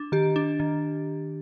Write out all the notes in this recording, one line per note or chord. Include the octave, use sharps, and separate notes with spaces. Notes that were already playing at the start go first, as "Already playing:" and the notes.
Already playing: D4
D#3 G4
D4
D#3